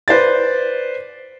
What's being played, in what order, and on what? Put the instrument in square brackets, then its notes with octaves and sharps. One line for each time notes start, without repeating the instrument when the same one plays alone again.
[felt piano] B4 C5 D5 A6